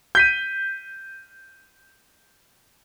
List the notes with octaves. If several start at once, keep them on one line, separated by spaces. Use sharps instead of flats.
G6 B6 D#7